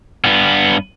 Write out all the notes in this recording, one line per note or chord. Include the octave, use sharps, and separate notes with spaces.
G2 B3